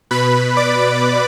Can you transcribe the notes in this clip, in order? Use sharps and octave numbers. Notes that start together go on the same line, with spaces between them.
B2 B4 B5
D5 D6